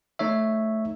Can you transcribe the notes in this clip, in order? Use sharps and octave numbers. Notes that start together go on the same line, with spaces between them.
A3 D#4 C#5 E5